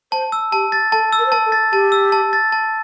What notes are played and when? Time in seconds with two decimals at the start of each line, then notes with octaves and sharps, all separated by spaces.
0.12 C5 A5
0.32 E6
0.52 G4 A5
0.72 A6
0.92 A4 A5
1.12 E6
1.19 A#4
1.26 C5
1.32 A#4 A5
1.46 A4
1.52 A6
1.72 G4 A5
1.92 E6
2.12 A5
2.33 A6
2.52 A5